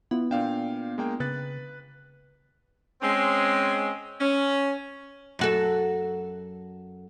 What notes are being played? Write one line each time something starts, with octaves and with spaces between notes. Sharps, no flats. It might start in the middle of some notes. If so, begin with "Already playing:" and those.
B3 E4 F4
A#2 D4 F5 G5
G#3 A#3 G5
C#3 B4 F#6 A6
G#3 C4 C#4
C#4
F#2 F#4 A4